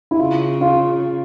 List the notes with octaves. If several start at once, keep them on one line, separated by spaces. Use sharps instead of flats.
E4
C#3 F4
F4